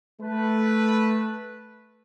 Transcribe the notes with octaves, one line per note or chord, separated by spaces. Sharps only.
A3 B4